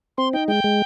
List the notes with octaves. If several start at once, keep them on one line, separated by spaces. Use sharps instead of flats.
C4 C6
D#4 G5
G#3 G5
G#3